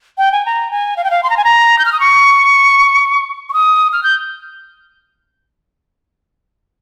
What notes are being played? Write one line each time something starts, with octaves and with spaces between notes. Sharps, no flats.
G5
G#5
A#5
G#5
F5
G5
F5
C6
A#5
G#5
A#5
G6
F6
D#6
C#6
C#6
D#6
F6
G6